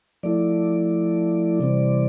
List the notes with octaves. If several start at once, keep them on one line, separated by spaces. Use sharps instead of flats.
F3 A3 E4 D5
C3 E3 G3 C4